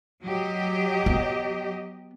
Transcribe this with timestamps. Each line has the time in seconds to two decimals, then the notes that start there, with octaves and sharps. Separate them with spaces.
0.23 F#3 G4 D#5
1.06 B3